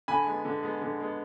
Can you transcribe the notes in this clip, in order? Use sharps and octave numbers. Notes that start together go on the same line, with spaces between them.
D3 G#5 B5
G#3 B3
D3
G#3 B3
D3
G#3 B3